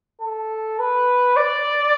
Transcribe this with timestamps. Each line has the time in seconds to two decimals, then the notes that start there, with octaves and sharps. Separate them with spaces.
0.21 A4
0.79 B4
1.37 D5